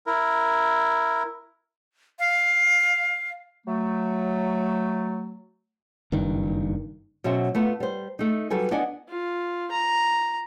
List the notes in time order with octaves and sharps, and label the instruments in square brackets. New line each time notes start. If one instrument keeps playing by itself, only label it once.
[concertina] E4 A#4
[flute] F5
[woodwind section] F#3 A3
[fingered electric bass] F#1 G2 D#3
[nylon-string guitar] B2 F#3 C#4 C5 E5
A3 B3 F4
G3 C5
A3 D#4
F#3 G3 A4 B4 G#5
B3 D4 D5 D#5 F#5 G#5
[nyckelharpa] F4
A#5